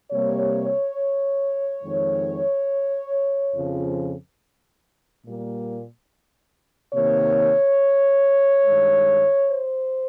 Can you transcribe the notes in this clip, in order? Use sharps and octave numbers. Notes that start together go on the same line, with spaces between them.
C3 G3 A#3 C#5
F2 D#3 G#3
F2 C#3 F3
A#2 G3 A#3
C3 D#3 A#3 C#5
G2 D#3 G#3
C5